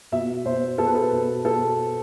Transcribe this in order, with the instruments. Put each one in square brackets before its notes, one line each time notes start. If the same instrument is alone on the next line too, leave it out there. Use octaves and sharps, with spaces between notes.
[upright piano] B2 E5
B2 C5
B2 A4
B4
A4
B2
B2 A4